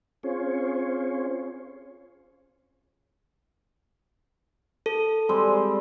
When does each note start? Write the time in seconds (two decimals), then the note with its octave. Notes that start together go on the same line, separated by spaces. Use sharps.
0.23 C4 C#4 F4 G#4 C5 C#5
4.86 A4
5.29 G3 G#3 C4